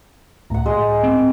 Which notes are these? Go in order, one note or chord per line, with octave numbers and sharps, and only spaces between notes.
C#2 A2 F#5 A#5
G#3
C4